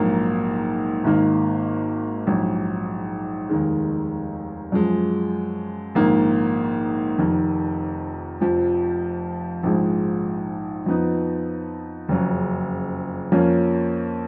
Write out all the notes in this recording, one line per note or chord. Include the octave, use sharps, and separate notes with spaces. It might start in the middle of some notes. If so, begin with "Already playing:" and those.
Already playing: A#1 G#2 F#3 A#3
G#1 G#2 D#3 A#3
A#1 G#2 F#3
F1 D#2 D#3 G#3
F#2 F3 G#3
A#1 G#2 D#3 A#3
F1 F2 D#3
F1 F2 F3
A#1 G#2 F3 G#3
F2 F3 B3 D#4
F#1 F2 C#3 F#3
F2 F3 A#3 C#4